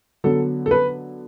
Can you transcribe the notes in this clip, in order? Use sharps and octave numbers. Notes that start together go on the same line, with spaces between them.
D3 F#3 B3 A4
A4
B4